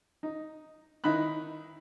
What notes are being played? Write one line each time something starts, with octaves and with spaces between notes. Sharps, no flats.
D#4
D#3 D#4 E4 B5 F#6